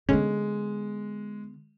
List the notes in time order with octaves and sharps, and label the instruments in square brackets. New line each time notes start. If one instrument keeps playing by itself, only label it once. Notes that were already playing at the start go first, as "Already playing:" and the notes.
[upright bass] D3 B3 [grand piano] G#3 [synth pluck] C#4